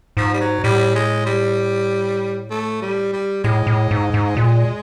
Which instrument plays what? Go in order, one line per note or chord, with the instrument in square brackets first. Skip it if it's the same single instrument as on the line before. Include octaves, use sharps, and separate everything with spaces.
[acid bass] G#2 [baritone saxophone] F3
[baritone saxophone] G3
F#3
[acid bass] A2 [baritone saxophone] G3
[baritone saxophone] G#3
G3
A3
G3
G3
[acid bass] A2 [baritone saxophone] G#3
[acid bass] A2
G#2
G#2
A#2